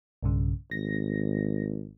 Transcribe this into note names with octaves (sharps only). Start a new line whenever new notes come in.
B1 G2 C#3
G#1 A#6